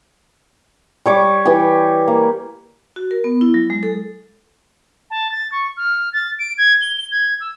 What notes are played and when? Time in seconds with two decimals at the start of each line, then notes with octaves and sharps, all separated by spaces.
1.06 G3 C#5 D6
1.45 E3 G4
2.08 A#3
2.96 F#4
3.11 A#4
3.24 B3
3.41 E4
3.54 F#3
3.70 G#3
3.83 A4
5.10 A5
5.32 A6
5.52 C#6
5.77 F6
6.13 A6
6.39 D7
6.58 G#6
6.81 G7
6.98 G7
7.12 G#6
7.40 E6